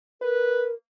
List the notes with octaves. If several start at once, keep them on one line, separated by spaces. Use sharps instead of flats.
A#4 B4